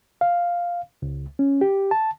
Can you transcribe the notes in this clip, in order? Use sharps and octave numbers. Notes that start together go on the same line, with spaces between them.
F5
C#2
C#4
G4
A5